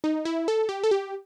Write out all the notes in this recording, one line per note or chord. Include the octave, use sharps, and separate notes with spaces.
D#4
E4
A4
G4
A4
G4